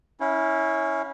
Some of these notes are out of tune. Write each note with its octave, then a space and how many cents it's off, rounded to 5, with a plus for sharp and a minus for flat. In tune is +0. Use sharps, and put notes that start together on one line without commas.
C#4 +5 E4 -20 F5 +25